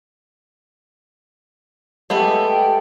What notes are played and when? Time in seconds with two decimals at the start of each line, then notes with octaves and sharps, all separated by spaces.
2.10 G#3 A3 B3 G4 A4
2.44 G5